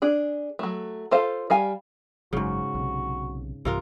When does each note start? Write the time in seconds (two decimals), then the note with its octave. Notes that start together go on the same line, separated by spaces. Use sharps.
0.02 D4 G#4
0.59 F#3 A3
1.11 F4 A4 C5 F5
1.50 G3 F5 G#5
2.33 F#1 C#2 G#2 C#3 F#3 F#4
2.75 B1 C3
3.65 B1 G2 C3 E3 F4 A#4